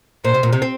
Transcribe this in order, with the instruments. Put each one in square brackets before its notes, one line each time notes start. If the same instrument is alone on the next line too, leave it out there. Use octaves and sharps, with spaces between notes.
[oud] A#2 [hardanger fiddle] C5
[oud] C3
A#2
C3
C4